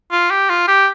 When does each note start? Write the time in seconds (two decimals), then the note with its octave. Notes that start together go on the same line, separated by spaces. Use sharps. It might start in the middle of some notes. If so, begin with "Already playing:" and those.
0.11 F4
0.30 G4
0.49 F4
0.68 G4